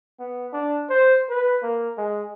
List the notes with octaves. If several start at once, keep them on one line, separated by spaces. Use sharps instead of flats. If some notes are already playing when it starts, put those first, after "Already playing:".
B3
D4
C5
B4
A#3
G#3